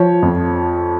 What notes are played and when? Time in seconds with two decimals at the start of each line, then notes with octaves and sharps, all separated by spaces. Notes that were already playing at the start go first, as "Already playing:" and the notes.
Already playing: F3 C#5
0.22 F2